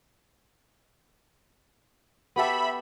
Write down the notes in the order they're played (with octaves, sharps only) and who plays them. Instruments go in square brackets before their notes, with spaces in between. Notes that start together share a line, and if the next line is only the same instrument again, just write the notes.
[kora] B3 G4 A4 [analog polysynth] E5 B5